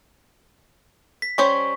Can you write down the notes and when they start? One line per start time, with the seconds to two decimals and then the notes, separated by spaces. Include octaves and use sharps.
1.22 B6
1.38 G3 C#4 C5 C#6